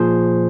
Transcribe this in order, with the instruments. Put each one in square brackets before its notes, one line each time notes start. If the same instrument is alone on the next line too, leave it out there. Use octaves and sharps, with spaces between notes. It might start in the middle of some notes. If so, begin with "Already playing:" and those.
Already playing: [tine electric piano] A#2 F3 G#4 C5